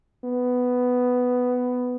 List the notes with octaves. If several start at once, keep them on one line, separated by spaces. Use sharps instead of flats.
B3